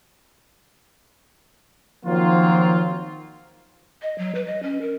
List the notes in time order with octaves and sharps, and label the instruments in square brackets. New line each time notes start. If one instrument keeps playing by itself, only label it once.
[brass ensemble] D#3 F3 F#3 A#3 C4 F4
[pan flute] D#5
F#3
B4
D#5
C#4
A#4